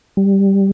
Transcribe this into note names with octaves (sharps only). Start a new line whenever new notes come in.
G3